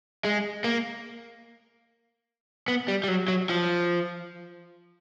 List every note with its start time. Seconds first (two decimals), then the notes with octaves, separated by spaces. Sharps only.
0.25 G#3
0.64 A#3
2.68 B3
2.88 G3
3.04 G3
3.08 F#3
3.28 F#3
3.49 F3